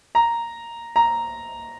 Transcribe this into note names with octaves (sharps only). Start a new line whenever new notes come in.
A#5
A#5